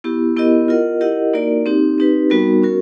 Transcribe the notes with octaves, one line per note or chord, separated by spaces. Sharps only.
B3 E4 G4
B3 E4 G4 A#4 D#5
F4 A#4 D#5 F#5
E4 G4 A#4 D#5 F#5
A#3 D#4 F#4 A#4 D5
C4 D#4 G4
C4 D#4 G4 B4
G3 B3 D#4 F#4 A#4
C#4 F#4 A#4